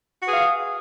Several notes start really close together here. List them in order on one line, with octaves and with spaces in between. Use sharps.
F#4 B4 G#4 F5